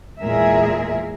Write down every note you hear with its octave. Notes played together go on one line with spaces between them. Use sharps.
E2 A#2 G#3 G#4 A#4 E5